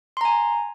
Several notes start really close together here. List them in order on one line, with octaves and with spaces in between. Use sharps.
C6 A#5 G#5